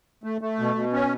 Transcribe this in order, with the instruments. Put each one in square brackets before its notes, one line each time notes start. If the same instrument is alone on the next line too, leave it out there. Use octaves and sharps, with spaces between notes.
[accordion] A3
A3
B2
B2
C#4